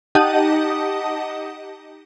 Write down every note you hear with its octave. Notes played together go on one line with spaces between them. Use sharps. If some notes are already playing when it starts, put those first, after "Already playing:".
D#4 G4 D#5 F#5 A5 D#6